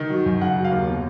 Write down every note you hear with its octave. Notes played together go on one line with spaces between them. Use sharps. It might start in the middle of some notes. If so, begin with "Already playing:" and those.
Already playing: D#3
F#3
F#2
C#3 F#5
F#3
F5
D#2
B2